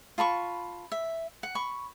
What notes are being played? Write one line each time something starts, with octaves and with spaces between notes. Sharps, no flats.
F4 A5 B5 C#6
E5
F#5
B5 C#6